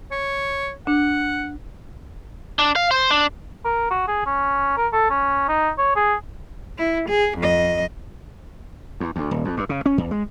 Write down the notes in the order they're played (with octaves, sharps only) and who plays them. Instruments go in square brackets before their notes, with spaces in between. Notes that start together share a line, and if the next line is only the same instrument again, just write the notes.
[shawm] C#5
[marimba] D4 [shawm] F#5
[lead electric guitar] D4
F5
C5
D4
[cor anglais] A#4
F#4
G#4
C#4
A#4
A4
C#4
D#4
C#5
G#4
[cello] E4
G#4
F2 D#5
[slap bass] E2
D2
D#1
F2
G2
C#3
C#4
E2
G#3